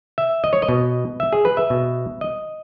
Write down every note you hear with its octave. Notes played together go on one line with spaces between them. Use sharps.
E5
D#5
C#5
D#5
B2
E5
G#4
B4
E5
B2
D#5